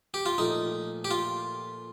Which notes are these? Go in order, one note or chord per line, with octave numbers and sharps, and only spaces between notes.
G4
F4
A#2 F3 A3 D#4
G4
F4